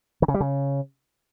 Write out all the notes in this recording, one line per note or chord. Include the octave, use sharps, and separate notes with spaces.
D#3
C#3
G3
C#3